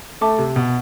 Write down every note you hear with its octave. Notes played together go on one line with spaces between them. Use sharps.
A3 E5 A5 D6
C3
B2